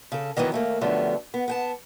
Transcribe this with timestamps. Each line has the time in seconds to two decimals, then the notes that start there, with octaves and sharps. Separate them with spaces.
0.12 C#3 A4
0.37 D#3 E3 F#3 B3 D#4
0.52 D#2 A3 A#3
0.81 F#2 D3 F3 G3 A3 B3
1.34 B3
1.48 B3 G5 A5